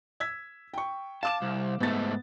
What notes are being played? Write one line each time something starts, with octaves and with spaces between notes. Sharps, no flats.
E6 G#6 B6
G5 C#6
F5 A5 D6 E7
C2
G#2 A3 B3 A6